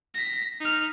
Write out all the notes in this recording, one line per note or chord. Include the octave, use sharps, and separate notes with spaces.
A#6 B6
D#4 F6